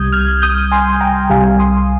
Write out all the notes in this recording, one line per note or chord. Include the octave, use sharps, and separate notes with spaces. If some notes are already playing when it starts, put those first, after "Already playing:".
Already playing: C2 C3 G3 D#6 G6 G#6
F6 G#6
D#6 G6
G#5 C6
G5 A#5
C2 C3 G3 F5 G#5
C6 D#6